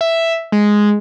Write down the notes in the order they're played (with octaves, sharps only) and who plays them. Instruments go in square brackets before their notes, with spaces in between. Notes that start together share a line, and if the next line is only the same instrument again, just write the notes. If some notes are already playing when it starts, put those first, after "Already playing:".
[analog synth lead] E5
G#3